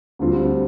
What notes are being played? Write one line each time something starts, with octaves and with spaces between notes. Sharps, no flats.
D2 D3 G3 C4 F4